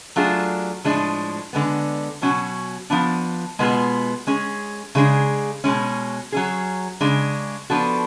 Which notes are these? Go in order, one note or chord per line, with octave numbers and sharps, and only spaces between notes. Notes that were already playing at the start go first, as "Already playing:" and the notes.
F#3 A3 D4 F4 G#4
A2 F3 G#3 D4
D3 G#3 B3
B2 F#3 C#4 F#4
F3 B3 D4
B2 G#3 B3 F4 G#4
G#3 C#4 G#4
C#3 G#3 D4 G#4
B2 G#3 C#4
F#3 C#4 G#4
C#3 G#3 D4
F3 B3 D4 F#4 A4